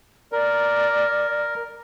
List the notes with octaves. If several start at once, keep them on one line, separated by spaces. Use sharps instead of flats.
A#4 D5